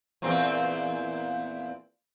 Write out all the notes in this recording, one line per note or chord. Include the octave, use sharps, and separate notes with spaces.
E2 A#2 C4